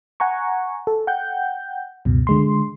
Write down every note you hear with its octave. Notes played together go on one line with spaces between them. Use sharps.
F#5 G#5 A#5 C#6
A4
F#5 G5 G6
C#2 F#2 B2
D3 G#3 C6